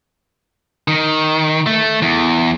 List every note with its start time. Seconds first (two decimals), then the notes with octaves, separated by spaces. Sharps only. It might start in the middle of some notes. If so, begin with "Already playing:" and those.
0.88 D#3
1.67 A3
2.02 E2